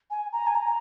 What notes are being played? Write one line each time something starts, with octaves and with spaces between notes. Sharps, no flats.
G#5
A#5
G#5
A#5